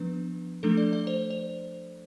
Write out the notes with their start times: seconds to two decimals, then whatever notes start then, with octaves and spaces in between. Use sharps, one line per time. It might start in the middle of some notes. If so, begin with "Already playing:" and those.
Already playing: F3 B3 D4 B4
0.63 F3 A3 D4 A4
0.77 D5
0.93 D5
1.07 C5
1.30 C5